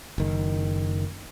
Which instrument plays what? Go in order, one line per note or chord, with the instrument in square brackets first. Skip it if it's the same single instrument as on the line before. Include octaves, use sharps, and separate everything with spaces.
[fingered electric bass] F#1 D#3